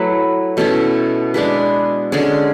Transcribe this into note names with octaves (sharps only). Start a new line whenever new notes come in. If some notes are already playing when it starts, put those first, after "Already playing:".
Already playing: F#3 A3 E4 B4
B2 A3 C#4 E4
G#3 D4 G#4 B4
D3 G#3 C#4 G#4